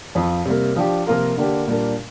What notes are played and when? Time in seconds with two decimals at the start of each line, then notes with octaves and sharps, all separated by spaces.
0.15 F2 F3 C4
0.45 C3 G3 A#3
0.76 F3 D4 G4
1.07 C3 F3 A#3 F4 A#4
1.37 D3 A#3 D4 G4
1.67 A#2 G3 D4 A#4